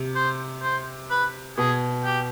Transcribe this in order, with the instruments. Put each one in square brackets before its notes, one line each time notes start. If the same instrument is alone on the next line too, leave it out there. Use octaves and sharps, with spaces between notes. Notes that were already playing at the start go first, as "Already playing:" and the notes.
Already playing: [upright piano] C3
[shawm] C5
C5
B4
[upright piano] B2 [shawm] G#4
[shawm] G4